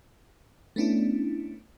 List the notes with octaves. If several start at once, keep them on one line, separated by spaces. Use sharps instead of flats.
A3 B3 C#4 D4 E4